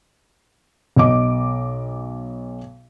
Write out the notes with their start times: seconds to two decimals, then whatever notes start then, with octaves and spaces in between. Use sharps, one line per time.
0.96 B1 D#5 D6